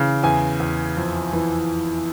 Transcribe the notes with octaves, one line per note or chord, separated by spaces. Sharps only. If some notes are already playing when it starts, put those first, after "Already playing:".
Already playing: C#3 E3
E2 G#5
E2
F2
E3